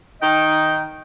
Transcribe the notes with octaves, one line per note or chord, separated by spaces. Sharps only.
D#3 D#4 D#5 G5